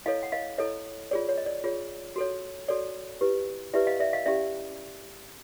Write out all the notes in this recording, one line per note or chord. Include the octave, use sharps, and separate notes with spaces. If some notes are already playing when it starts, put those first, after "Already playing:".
E4 A4 C#5 D#5 F5
F#5
D#5 F5
E4 A4 C#5 D#5
F4 G#4 C#5 D5
C#5
D#5
D5
F4 G#4 C#5
F#4 A4 C#5
F#4 A4 C#5 D5
E4 G4 B4
E4 G4 B4 D5 E5
D#5 F5
D5 E5
D#5 F5
C#4 E4 G4 D5 E5